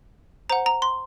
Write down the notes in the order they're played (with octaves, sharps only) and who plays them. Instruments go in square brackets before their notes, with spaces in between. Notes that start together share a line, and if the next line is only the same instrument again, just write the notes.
[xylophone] C5 F#5 A#5
A#5
C6